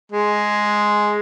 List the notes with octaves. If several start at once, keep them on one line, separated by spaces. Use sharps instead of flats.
G#3